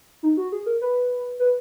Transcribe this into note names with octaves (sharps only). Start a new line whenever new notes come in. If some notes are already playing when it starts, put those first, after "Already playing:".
D#4
F#4
G#4
A#4
B4
B4